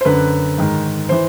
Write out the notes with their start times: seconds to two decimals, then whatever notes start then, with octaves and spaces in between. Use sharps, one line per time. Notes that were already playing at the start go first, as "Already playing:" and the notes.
0.01 C5
0.05 F#2 D3 B4
0.58 G#2 D#3
1.09 E3 C5